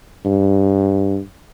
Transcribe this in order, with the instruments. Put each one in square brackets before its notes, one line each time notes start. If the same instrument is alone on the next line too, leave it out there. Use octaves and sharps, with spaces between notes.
[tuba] G2